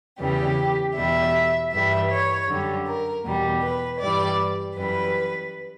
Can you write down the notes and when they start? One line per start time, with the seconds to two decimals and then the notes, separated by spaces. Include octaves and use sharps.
0.19 E2 C#3 E3 G3 G4
0.96 E2 B2 G3 E5
1.71 G2 E3 G3 E5
2.10 C#5
2.47 F#2 D3 G3
2.86 A#4
3.24 E2 B2 G3
3.62 B4
4.00 G2 E3 G3 D5
4.76 F#2 E3 G3 B4